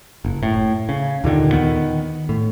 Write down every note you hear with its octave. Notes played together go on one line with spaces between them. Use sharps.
F#1
A2
C#3
D#2 A#2 D3 D#3
D#3 B3
A2